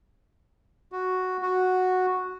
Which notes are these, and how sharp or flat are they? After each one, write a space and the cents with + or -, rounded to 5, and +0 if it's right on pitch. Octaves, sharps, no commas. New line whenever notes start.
F#4 +0
F#4 -5